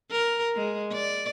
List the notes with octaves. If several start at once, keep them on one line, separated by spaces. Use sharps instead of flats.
A#4
G#3
D5